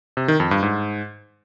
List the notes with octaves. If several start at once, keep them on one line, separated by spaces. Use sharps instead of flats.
C3
D#3
F2
G2
G#2